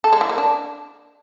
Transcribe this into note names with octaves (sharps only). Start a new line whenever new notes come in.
A4
G#3
E3
A#3
D4